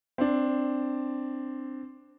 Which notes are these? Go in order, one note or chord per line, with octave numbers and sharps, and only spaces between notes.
C4 D4